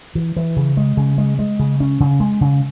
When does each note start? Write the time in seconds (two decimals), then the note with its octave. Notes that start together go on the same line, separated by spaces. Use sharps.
0.15 E3
0.36 E3
0.57 C#3
0.77 G#3
0.97 C#3
1.18 G#3
1.39 G#3
1.59 C#3
1.80 C#4
2.00 C#3
2.20 G#3
2.41 C#3